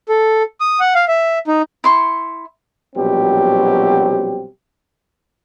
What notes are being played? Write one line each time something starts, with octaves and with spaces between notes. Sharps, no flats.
A4
D#6
F#5
F5
E5
D#4
E4 C6 C#6
A#1 B2 F#3 G3 C4 G4